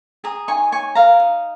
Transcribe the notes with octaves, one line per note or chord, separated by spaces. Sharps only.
G#4 A#5 D#6
D#4 G#5 C#6
C#5 G#5 C#6
A#4 F5 A#5
D#4